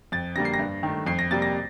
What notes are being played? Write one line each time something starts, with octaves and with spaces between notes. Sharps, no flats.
F2 A6
D3 G3 A#3 A#6
C7
A#6
G2
D#3 A3
F2 C7
A#6
C3 G3 A#3 A6
A#6